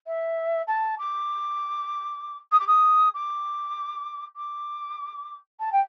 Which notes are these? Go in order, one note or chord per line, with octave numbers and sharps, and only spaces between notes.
E5
A5
D6
D#6
D6
D#6
D6
D6
A5
G5